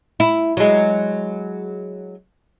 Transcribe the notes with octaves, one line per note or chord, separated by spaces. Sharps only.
E4
F#3 G#3